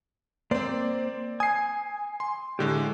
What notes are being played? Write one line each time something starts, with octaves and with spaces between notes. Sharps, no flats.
A#3 C4 C5 D5
G#5 D#6 C7
C6
A2 D3 G#3 G4